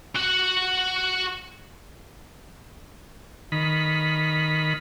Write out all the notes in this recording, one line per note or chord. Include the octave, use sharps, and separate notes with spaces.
F#4 F#5
D#3 B5